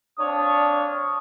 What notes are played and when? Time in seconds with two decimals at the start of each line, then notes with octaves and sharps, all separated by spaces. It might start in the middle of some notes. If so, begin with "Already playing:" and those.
0.20 C4 D4 C#5 F5 D#6